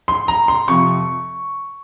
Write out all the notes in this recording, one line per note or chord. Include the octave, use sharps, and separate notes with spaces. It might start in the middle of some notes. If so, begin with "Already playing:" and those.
C6
A#5
C6
F2 C3 F3 C#6